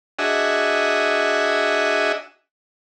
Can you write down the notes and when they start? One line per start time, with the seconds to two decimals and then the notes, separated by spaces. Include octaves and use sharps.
0.19 D4 F#4 G#4 D#5 E5